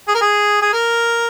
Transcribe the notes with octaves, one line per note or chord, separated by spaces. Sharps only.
G#4
A#4
G#4
G#4
A#4